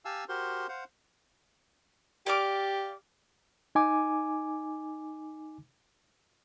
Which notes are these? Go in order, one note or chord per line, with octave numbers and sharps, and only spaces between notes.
G4 F5 G#5 A5 E6
F#4 G4 A#4 C5 C6
C5 F5 F#5
G4 D5 F5 D6
D#4 G#5 D6